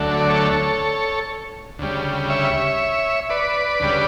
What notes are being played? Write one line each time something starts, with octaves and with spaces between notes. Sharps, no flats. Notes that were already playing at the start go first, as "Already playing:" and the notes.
Already playing: D2 D3 F#3 A3
D5
A4 C#5
D2 C#3 G3
C#5 E5
B4 D5
D2 C#3 G3